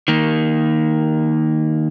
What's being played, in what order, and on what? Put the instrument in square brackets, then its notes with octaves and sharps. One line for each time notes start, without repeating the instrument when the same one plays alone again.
[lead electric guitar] D#3 A#3